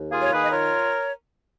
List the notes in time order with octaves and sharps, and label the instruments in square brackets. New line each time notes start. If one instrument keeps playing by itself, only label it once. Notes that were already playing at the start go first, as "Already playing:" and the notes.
Already playing: [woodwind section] D#2
A#3 F4 G#4
C#5
D#3 G#4 B4
D#5
F4 A#4 C#5